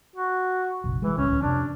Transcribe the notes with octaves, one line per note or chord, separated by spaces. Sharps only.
F#4
F1 A#1
E3 G#3
D1 C#2 C#4
F2 C3 D4